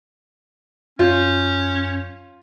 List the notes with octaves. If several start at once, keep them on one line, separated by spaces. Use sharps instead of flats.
F#2 C#4 F4 C#5 G6